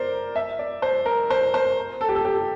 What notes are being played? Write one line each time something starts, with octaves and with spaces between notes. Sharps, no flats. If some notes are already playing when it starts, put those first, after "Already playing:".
Already playing: A#4 C5 D5
E5
D5
C5
A#4
C5
C5
A4
G4
A4
G4